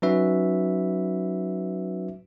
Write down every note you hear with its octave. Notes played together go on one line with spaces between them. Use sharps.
F#3 C#4 D#4 F#4 B4 E5